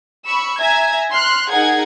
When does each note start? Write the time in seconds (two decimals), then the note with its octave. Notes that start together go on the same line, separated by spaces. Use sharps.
0.24 B5 C#6 E6
0.60 E5 G#5 A#5 G#6
1.11 C6 F6 F#6
1.50 D#4 G#4 A#4 F#5 G#6